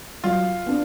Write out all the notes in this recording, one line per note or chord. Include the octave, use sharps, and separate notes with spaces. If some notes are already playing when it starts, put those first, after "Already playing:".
F#3 F4
B3 D4